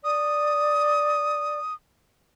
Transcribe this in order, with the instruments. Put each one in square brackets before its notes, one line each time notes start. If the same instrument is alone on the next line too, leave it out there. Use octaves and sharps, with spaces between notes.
[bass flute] D5 [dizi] D#6